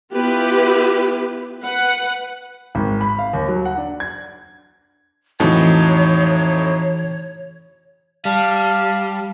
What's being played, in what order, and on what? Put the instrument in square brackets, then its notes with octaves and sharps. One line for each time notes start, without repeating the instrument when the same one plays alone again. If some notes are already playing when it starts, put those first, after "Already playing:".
[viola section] B3 E4 F4 G4 B4
B4 F#5
[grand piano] G#1
B5
F5
D#2
F#3
F#5
D4
G#6
[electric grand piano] F2 A2 D#4 [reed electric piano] E3 F#4 A5 [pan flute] C#5
[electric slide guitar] G3 [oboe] F5 [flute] A5